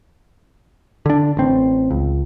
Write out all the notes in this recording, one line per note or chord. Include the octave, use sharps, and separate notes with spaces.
D3 D4
A1 C4
C#2